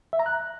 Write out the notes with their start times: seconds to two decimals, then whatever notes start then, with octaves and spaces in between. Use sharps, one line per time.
0.13 E5
0.19 A#5
0.26 F#6